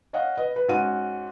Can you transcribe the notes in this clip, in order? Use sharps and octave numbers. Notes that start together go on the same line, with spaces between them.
C#5 D#5 F5 F#5
B4 D#5
B4
G#2 C#4 F#4 D#7